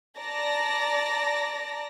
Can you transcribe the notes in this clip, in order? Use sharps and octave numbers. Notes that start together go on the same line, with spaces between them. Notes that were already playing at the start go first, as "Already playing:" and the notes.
D5 A5 A#5 A#6